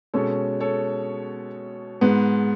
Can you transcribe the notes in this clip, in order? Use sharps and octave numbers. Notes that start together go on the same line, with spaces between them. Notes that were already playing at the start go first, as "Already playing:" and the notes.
B2 G#3 C#4 A4 C#5
A4 C#5
G#2 G#3 B3